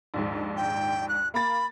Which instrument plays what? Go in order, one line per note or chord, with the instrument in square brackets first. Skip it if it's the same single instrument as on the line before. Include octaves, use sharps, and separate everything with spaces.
[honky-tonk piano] A#1 D#2 G#2
[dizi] G5
F#6
[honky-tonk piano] A#3 A6 [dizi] B5